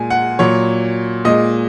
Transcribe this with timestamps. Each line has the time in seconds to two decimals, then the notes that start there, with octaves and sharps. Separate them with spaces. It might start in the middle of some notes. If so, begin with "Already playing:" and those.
Already playing: A#2 G#3 G#5
0.10 F#5
0.39 A#2 F#3 C#5
1.25 A#2 G#3 D#5